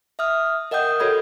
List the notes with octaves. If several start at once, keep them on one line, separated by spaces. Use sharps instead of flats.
E5 D#6 F6
A#4 D#5 F#5 G5 D#6 G6
F#4 A4 C#5 B5 G#6